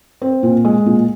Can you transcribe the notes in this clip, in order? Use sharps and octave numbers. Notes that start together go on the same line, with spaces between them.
C4
A#2
G#3
A#2